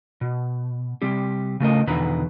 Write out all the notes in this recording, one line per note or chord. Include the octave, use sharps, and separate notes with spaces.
B2
C3 G3 C4 G4
C#3 A3 A#4 D#5
E2 B2 D3 D#3 B4 A#5